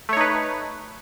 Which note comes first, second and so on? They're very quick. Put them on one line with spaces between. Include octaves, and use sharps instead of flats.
A3 C#5 D#4 B4